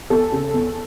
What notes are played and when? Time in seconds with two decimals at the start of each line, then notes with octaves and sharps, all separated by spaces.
0.10 E2 A4
0.32 C#3
0.54 E2